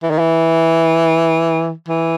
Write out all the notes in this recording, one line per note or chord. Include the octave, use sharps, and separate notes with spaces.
E3
D#3
E3
E3